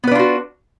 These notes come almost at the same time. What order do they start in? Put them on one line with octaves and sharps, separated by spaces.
B3 B4 D4 F4 F#4